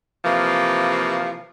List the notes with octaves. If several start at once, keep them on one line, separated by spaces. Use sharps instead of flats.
C3 E3 F3 A#3